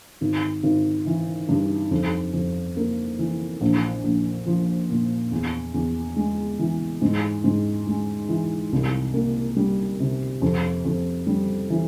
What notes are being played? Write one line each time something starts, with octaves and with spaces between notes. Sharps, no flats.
G#1
G#1
E3
G2
F2
F2
A#3
E3
A#1
A#1
F3
A#2
E2
E2
G#3
E3
G#2
G#2
G#3
E3
C2
A#3
G3
C3
F2
F2
G3
E3